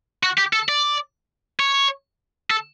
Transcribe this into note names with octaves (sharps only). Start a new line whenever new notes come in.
F#4
G4
A4
D5
C#5
A4